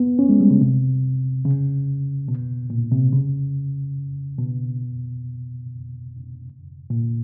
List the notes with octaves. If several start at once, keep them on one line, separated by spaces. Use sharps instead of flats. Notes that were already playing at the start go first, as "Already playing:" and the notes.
Already playing: B3
C#4
G#3
G3
C#3
C3
C#3
B2
A#2
C3
C#3
B2
A#2